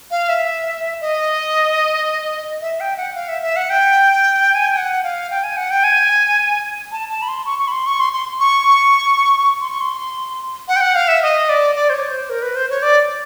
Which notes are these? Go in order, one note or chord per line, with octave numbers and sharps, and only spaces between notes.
F5
E5
D#5
E5
G5
F#5
F5
E5
E5
F#5
G5
G#5
G5
F#5
F5
G5
G#5
F#5
G5
G#5
A5
A5
B5
C6
C#6
C#6
B5
C6
C#6
C6
C6
C#6
C6
C#6
C6
F#5
G5
F#5
F5
E5
D#5
D5
D5
C5
C#5
C5
A#4
B4
C5
C#5
D5